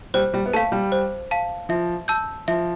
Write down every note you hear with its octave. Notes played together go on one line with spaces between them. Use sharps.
G3 C5
G3
B3
A3 F5 A5
G3
C5
F5 A5
F3 E5
A5 E6 G6
F3 E5